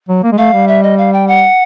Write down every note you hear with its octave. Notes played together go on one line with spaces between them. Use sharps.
F#3
A#3
G#3
A3 F5
G3
E5
D#5
F5
G5
F#5